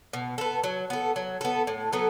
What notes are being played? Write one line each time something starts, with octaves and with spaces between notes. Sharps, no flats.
B2
B3 A4
F#3
B3 A4
F#3
B3 A4
A2
F#3 B3 A4